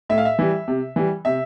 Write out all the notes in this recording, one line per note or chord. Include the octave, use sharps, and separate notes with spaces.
A2 E5
F5
E5
E3 G3
C3
E3 G3
C3 E5